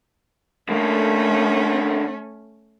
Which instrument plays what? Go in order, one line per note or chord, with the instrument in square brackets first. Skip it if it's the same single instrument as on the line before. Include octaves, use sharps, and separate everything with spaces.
[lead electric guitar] D3 A#3 [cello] A3 C#4